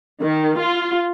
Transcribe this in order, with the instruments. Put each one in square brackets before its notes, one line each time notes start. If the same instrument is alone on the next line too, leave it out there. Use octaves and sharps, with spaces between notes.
[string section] D#3
F4